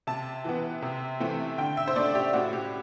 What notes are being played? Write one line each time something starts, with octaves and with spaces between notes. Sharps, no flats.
C3 A5
E3 B3
C3
E3 A3 C4
D3 G5
E5
C5
A3 D4 D5
G4
A2 F#4
G4